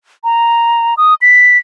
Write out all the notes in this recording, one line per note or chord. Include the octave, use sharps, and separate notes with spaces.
A#5
D#6
B6